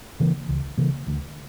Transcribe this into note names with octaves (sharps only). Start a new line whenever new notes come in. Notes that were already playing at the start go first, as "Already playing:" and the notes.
C#3 E3 A#3
C#2
C#3 E3 A#3
D2